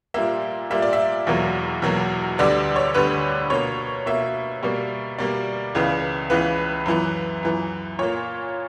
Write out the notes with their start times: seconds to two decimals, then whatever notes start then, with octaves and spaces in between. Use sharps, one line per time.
0.14 A#2 G3 A#3 E5
0.70 A#2 G3 A#3 E5
0.82 D5
0.93 E5
1.27 E2 B2 F#3 A#3
1.82 E2 B2 F#3 A#3
2.38 D2 D3 G3 B3 D5
2.76 C#5
2.95 D2 D3 G3 B3 B4
3.50 B2 A#3 C#5
4.06 B2 A#3 E5
4.63 B2 G3 A#3
5.18 B2 G3 A#3 D5
5.75 C#2 C#3 E3 B3
6.30 C#2 C#3 E3 B3 B4
6.86 F#2 E3 B3
7.43 F#2 E3 B3
7.99 A#2 A#3 C#5